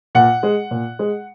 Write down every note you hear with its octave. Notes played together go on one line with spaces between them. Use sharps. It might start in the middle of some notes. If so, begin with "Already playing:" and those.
A#2 F#5
G#3
A#2
G#3